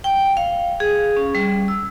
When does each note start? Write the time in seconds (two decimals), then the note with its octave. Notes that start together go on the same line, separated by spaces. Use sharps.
0.04 G5
0.37 F5
0.80 G#4
1.17 C#4
1.35 G3
1.68 E6